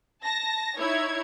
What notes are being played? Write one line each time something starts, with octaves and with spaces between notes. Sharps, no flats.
A5 A#6
D#4 E4 C#5 G#6